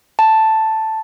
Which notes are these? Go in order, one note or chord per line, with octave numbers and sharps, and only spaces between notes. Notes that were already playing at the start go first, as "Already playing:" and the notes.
A5